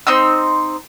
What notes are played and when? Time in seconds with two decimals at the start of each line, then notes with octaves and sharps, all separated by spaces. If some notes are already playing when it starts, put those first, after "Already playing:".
0.07 C4 D#4 C6 E6